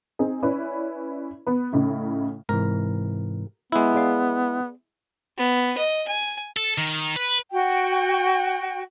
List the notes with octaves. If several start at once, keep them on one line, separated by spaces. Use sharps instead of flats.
C4 D#4 G#4
C#4 E4 B4 C#5 D5
B3 B4
A2 C#3 D#4 E4
G#2 C3 E3 A#4
G#3 B3 E4
G#4 D5 F5
B3
D#5
G#5
A4
D#3
B4
F#4 G5